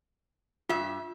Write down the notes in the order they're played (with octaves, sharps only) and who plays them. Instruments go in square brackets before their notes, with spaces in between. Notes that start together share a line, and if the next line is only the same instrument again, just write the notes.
[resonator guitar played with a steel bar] G2 E5 [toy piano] F4